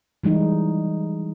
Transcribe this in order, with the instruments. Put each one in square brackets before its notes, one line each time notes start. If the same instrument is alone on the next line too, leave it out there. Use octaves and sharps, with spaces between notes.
[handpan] E3 G3 G#3 D#4